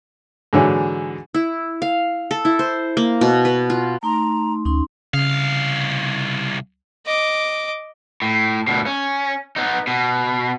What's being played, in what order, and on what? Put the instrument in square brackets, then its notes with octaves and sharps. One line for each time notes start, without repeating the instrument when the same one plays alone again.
[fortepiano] G#2 D3 E3 F#3
[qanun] E4
F5
A4
E4
C5
A#3
B2
B4
F4
[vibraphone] A3 D#4 C6 [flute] A#5
[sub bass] D2 [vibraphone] C#4 D#4 C6
[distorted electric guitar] C2 F5 [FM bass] C#3
[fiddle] D#5 D6
[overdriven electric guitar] A2
D2 B2
C#4
B3 D#4
B2